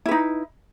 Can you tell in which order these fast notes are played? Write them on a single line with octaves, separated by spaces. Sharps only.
E4 B4 D#4